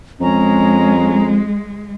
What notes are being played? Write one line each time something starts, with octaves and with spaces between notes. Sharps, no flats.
F2 G#3 C#4 A#5